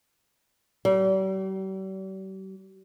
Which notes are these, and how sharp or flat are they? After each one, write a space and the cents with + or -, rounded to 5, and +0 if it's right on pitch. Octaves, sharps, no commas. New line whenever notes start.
G3 -45